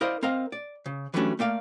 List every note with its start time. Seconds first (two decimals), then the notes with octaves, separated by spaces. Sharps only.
0.01 E4 A#4 C5 D5 D#5 F5
0.23 C4 A#4 D#5 F5
0.52 D5
0.86 C#3
1.14 E3 F#3 G3 A3 C#4 D4
1.39 A3 A#3 D5 F5